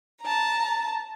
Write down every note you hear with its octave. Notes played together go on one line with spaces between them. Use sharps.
A5 A#5